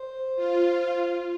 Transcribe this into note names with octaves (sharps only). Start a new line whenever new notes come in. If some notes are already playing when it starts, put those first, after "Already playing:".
Already playing: C5
F4